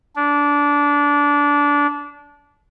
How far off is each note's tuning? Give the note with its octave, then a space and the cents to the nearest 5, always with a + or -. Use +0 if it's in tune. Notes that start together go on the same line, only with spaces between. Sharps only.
D4 -20